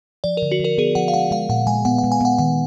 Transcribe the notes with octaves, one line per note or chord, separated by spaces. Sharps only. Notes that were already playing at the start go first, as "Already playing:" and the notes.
F3 D5
D3 A#4
F#4
F3 A#4
B3 G#4
F3 F#5
F5
G#3 F#5
G#3 F5
A#2 F#5
G#3 G#5
B3 F#5
G#3 F#5
G#5
B3 F#5
D#3 F#5